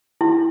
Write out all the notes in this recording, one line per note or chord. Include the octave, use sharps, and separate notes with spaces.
E4